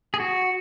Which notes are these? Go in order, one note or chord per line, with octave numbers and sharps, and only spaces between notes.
G#4
F#4